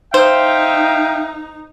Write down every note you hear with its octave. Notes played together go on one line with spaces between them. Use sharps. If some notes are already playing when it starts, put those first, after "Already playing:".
D#4 C5 E5 F5 G5